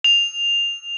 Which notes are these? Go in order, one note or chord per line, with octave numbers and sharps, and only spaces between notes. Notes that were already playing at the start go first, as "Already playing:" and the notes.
F7